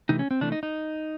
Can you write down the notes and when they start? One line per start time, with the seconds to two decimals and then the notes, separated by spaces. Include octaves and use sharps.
0.09 C3 E3 A3 D#4
0.19 C#4
0.31 C4
0.41 C3 E3 A3 D4
0.52 D#4
0.63 D#4